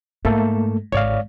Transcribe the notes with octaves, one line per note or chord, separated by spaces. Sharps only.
G#2 A3 A#3 A4
G#1 C#5 D5 F5